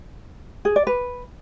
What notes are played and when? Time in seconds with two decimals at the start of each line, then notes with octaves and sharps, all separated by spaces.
0.65 G#4
0.76 D5
0.87 B4